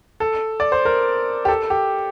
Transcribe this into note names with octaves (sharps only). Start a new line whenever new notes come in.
A4
D5
C5
A#4
G4
A4
G4